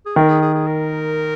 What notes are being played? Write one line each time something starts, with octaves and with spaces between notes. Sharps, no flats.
G#4
D#3 A#4
G#4
G#4
G#4
A#4